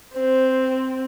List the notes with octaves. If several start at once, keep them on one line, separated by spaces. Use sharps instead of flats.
C4 C5